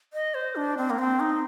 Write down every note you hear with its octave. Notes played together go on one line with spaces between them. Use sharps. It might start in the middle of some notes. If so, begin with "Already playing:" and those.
D#5
C5
D4
C4
A#3
C4
D#4